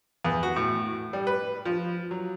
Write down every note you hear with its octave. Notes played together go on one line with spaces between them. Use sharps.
E2
F#4
A2
G3
B4
F3
F#3